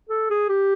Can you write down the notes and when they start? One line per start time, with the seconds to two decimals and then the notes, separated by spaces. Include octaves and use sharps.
0.09 A4
0.30 G#4
0.49 G4